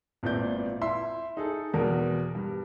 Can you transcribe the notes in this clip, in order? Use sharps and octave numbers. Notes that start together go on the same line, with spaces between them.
G#1 A#2 B3 E4 D5 G6
E4 E5 C6
D#4 G#4 A4
E2 B2 A#4
G2